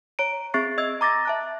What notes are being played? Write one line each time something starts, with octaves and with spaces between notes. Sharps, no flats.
C#5 A#5 D7
C4 G#4 E5 C#6 A6 C7
D#5 E6 G#6
A#5 D6 A6 A#6
E5 A5 F#6